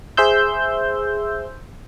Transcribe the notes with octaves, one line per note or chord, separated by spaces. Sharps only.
G#4 C5 E5 C6 E6 G6